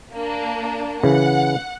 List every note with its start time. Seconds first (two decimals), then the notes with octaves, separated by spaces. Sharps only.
0.13 A#3 D4
1.03 C#3 E3 F#5